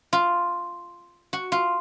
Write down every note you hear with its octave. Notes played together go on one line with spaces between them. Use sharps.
F4
F#4
F4